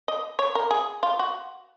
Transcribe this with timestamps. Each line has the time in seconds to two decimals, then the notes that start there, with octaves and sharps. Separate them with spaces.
0.08 D#5
0.39 C#5
0.55 A#4
0.71 G#4
1.03 F4
1.19 F#4